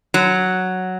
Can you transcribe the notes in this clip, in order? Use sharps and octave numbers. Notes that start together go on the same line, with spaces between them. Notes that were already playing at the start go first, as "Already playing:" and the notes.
F#3